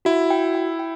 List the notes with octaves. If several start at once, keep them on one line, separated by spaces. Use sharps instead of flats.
E4 F#4
G5
G5
G5